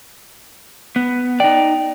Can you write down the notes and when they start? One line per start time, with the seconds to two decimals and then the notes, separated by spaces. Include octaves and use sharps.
0.96 B3
1.40 D#4 D5 G5